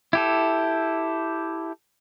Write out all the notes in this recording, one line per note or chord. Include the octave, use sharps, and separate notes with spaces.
E4 G4 A4